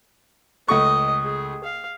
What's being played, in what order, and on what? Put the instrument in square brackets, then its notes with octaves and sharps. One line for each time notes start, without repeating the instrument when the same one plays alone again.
[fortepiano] C#2 A3 C#6 [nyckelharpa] D#5
[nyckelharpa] G#4
F5